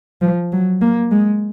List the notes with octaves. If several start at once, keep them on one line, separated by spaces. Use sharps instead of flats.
F3
F#3
A#3
G#3